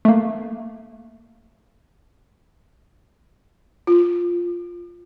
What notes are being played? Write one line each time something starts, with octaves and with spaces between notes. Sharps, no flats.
A3 A#3
F4